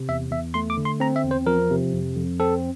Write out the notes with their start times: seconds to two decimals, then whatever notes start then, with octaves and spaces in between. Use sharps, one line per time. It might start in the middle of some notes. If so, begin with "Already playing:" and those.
Already playing: C3
0.09 E2 E5
0.31 E2 E5
0.54 A3 C6
0.70 D6
0.77 D3
0.85 C6
1.00 C4 A#5
1.16 E5
1.24 E2
1.31 C5
1.47 F3 A#4
1.70 C3
1.93 F2
2.16 F2
2.40 C4 A4